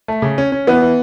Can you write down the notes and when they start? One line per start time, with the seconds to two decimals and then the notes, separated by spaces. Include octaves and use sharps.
0.08 A3
0.22 C#3
0.38 C#4
0.52 C#4
0.67 E3 B3
0.82 E3